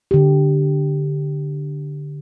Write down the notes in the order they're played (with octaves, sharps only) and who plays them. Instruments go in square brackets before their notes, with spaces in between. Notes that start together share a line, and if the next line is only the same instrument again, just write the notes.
[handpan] D3 G4